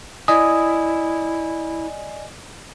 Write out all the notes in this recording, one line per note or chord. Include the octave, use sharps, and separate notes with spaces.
E4 D5 D#5 G#5 D#6